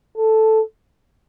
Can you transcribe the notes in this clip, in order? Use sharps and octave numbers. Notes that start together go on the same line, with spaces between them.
A4